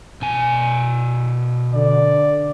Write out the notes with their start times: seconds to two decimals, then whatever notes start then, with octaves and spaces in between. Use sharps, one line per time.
0.22 B2 G#5
1.74 D3 D5